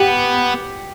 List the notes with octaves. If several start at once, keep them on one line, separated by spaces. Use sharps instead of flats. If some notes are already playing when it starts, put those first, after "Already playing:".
Already playing: B3 G4